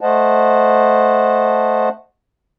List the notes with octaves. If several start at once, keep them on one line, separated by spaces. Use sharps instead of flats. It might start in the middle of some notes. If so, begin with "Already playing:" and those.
A3 C5 D#5 F#5 A5